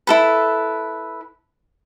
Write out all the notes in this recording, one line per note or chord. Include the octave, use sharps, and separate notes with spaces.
E4 A4 B4